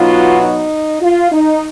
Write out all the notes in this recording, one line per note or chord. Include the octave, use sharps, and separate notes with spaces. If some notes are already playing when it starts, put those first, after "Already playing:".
Already playing: B2 F#3 B3 D#4 F4
D#4
F4
D#4